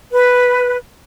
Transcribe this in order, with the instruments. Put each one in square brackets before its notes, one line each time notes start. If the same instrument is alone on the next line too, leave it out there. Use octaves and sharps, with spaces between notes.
[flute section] B4